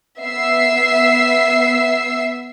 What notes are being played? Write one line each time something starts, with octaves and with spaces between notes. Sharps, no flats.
B3 E5 E6 C7